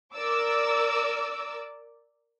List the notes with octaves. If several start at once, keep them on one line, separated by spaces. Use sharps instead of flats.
A#4 D5 D6 E6